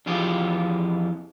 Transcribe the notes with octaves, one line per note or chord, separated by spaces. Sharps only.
F2 E3 F4 G4 G#4